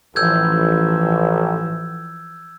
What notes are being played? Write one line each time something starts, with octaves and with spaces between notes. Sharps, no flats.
A1 E3 F3 E6 G6 G#6